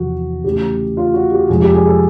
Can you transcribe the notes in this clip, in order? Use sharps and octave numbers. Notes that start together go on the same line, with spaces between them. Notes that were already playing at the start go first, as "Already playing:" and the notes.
Already playing: E2 C3 F3 F#4
C#3 E3 A3 G4
F4
F#4
G4
F2 C3 F3 G#3 G#4
G4
G#4
A4